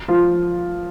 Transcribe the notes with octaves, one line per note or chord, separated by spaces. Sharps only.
F3 F4